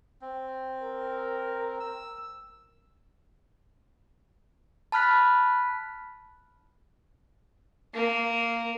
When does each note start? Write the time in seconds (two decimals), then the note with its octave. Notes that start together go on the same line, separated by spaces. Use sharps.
0.21 C4
0.83 A#4
1.80 E6
4.92 A5 B5 F6 F#6 B6
7.94 A#3